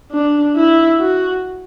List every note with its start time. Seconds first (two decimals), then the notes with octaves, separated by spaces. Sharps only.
0.12 D4
0.56 E4
1.00 F#4